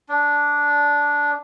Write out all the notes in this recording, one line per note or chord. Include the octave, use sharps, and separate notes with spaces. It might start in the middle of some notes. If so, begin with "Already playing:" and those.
D4